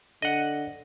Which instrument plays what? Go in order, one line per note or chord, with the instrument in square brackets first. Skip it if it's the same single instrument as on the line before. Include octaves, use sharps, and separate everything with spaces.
[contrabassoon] D3 [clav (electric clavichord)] D#5 F#5